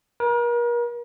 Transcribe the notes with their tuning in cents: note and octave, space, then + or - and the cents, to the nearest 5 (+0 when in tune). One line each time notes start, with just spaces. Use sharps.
A#4 +40